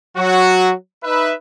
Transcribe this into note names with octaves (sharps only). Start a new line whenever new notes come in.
F#3 F#4
D#4 B4 E5